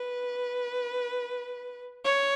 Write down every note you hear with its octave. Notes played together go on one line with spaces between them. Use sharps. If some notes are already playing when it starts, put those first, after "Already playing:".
Already playing: B4
C#5